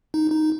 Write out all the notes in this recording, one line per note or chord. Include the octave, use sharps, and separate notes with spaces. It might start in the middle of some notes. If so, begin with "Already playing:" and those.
D#4
D#4